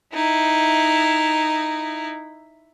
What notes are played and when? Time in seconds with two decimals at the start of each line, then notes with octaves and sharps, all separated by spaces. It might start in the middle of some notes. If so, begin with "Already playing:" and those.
0.14 D#4 E4